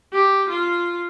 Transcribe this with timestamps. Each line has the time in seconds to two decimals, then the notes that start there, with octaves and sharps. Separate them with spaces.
0.13 G4
0.50 F4